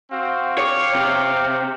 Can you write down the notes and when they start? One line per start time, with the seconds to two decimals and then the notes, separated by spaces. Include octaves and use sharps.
0.11 C4 F#4 F5
0.58 C#5 F5 G5 D6
0.95 C3